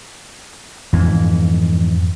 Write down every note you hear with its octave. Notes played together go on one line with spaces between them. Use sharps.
F2 G#2 E3